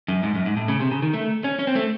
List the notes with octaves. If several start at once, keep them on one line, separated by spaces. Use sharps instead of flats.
F#2
G#2
F#2
G#2
A2
C#3
C3
C#3
D#3
A3
C#4
C#4
C4
A3